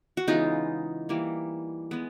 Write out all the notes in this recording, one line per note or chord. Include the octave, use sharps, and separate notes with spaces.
F#4
C#3 E3 G#3 B3 D#4 F4
E3 G3 A#3
G#3 B3